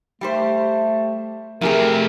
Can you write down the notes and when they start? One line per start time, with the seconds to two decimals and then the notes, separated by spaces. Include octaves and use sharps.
0.21 G3 A3 G4 C5
1.61 F2 C3 A3 E4 G4 G#4 A#4